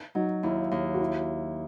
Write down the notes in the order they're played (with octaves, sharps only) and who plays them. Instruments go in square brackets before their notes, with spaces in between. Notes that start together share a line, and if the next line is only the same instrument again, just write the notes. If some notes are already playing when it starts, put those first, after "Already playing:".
[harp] F#3 [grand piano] D#4
[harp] D#2 [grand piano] E4
[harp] D#2
[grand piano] F#4
E4